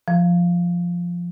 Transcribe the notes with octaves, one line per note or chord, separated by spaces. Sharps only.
F3